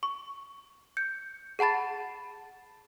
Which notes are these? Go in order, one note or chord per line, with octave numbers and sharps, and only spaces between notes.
C#6
G6 C#7
G#4 F#5 A5 B5 A6